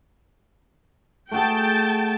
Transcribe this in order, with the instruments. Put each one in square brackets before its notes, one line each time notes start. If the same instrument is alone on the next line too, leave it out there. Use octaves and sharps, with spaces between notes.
[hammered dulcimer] A3 F#4 G#4 [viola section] G5 A5